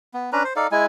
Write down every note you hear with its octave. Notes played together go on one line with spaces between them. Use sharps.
B3
C#4 D4 B4 A#5
C5
D#4 A4 D5 F5
G#3 E4 G#5